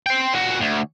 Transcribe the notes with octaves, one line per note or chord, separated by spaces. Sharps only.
C5 G5
A#2 F#4
D2